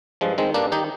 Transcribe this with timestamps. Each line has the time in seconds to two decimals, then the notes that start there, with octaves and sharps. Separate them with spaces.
0.21 G2 F3 G#3
0.38 D#3 G#3 C4
0.54 G2 A#3 D4
0.72 D#3 D#4 G4